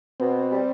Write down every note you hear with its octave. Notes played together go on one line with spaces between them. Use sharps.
B2 C4
G3